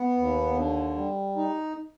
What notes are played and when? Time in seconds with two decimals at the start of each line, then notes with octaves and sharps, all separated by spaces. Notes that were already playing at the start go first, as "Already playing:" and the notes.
Already playing: B3
0.17 D#2
0.57 D3
0.96 G3
1.37 D#4